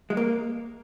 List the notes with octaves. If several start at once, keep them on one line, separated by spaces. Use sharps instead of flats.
G#3
A#3